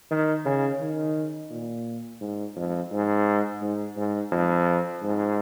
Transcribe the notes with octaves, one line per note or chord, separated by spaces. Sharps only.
D#3
C#3
D#3
A#2
G#2
F2
G#2
G#2
G#2
F2
G#2